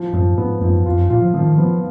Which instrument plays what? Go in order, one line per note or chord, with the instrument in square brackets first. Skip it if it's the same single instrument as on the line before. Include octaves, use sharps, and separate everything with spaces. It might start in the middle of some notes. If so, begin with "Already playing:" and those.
Already playing: [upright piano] F3
[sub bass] F#2 [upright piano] F3
[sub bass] G#2 [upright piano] B3
[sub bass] F#2 [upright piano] F3
[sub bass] F2 [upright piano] F4
[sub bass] F#2
[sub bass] A#2 [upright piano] F4
[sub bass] F3
[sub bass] D#3 [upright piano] F3
[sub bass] F3 [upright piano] B3